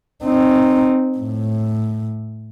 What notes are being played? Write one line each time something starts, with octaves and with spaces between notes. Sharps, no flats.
C4 D#4
A2